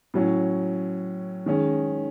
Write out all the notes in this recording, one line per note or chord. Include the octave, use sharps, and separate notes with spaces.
A2 F#3 C#4
D#3 G#3 C#4